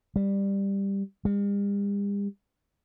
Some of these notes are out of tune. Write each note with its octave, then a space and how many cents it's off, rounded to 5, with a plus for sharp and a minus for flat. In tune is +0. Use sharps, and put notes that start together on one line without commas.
G3 +10
G3 +45